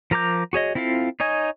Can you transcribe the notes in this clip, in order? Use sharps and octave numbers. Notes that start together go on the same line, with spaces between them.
F3 A#4 A#5 D6 G6
F#4 G#4 C#5 D#5
C4 E4 F4 A4 F5
D#4 C#5 D#5 G#5